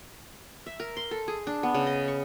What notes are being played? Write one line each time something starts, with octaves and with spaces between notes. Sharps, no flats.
E5
A#4
C6
A4
G#4
D4
B3
C#3
D#5
C#6